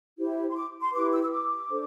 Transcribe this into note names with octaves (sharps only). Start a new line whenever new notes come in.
E4 G4 C5
C6
D6
C6
E4 G4 B4 D6
E6
E6
D6
D4 A4 C5